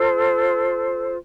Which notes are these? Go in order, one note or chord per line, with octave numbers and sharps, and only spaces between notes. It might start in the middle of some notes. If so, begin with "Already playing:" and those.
Already playing: F4 A4 C5